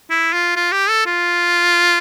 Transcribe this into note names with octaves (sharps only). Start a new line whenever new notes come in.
E4
F4
F4
G4
A4
F4